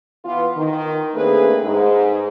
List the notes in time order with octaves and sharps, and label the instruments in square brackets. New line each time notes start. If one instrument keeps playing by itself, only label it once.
[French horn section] E3 B3 F4
D#3
A3 A#3 C4 D4 G#4 B4
G#2